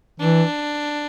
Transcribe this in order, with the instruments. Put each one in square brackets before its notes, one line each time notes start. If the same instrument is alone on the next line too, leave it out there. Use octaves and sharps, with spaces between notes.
[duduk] E3 [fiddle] D4